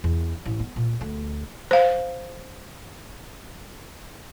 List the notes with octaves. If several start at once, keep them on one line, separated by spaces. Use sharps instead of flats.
E2
A1
B3
A#2
D2
C5 F5